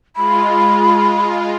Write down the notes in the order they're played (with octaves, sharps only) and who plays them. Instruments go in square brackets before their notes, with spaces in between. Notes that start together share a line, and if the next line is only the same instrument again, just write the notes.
[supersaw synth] G#3 F4 [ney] B5